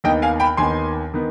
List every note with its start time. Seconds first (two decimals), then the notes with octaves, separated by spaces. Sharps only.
0.04 D#2 D#3 B3 D#5 G5
0.22 F5 G#5
0.40 G5 B5
0.57 D#2 D#3 B3 G#5 C6
1.14 D#3 B3